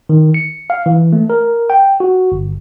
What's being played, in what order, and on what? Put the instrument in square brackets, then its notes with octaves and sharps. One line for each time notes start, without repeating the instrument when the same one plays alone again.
[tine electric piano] D#3
C#7
F5
E3
A3
A#4
G5
F#4
G1